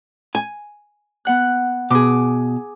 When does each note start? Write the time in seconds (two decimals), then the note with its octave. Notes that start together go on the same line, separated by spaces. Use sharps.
0.35 G#5
1.25 B3 F#5 F#6
1.90 B2 G#4 D6